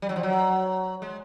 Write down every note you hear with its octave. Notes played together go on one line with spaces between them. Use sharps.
G3
F#3
F3
F#3
G#3